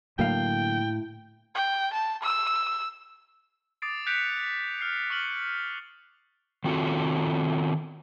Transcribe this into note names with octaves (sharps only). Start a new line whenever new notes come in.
A2 D3 F#3 A#3 F5 G5
G5
A5
E6
D6 D#6 A6 C7 D7
F#6 G6 B6 C#7 D7 F7
F6 C7
C#6 F6 C#7 F#7
D#3 C4 F4 F#4 A4